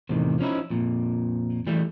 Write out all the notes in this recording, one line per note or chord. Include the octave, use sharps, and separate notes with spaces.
E2 A2 C3 D#3
F3 C#4 D#4 E4
F2 A#2
E3 G3 A3